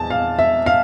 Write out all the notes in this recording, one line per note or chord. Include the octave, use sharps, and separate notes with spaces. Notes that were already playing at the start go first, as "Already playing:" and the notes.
Already playing: E2 A5
F5
E5
F5